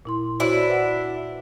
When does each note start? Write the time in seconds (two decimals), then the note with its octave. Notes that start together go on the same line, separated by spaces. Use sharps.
0.05 A#2 E4 C6
0.40 D4 E4 F#4 C5 C#5
0.68 B4 E5 F#5